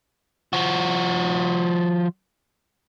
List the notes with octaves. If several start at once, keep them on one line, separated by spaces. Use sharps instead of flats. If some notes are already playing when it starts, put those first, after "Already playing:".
F3 F#4